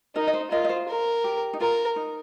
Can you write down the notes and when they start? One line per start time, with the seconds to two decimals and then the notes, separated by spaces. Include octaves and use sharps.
0.15 D#4 A#4 D#5
0.27 D#5
0.33 C5
0.51 F4 A#4 D#5
0.64 D#5
0.69 C5
0.88 A#4
1.24 G4
1.53 D#4
1.60 F4 A#4
1.96 D#4